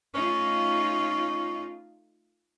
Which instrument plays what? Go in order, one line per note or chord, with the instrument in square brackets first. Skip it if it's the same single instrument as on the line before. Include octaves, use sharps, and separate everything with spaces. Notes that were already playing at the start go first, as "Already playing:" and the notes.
[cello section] A3 D#4 F4 [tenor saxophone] C#4